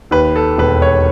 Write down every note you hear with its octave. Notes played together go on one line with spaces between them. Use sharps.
D#2 B4
A4
E1 B4
C#5